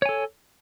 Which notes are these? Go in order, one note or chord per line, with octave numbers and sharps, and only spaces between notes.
A4 C#5 G#5